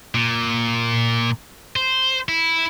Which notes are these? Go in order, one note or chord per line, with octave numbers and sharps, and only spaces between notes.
A#2
C5
E4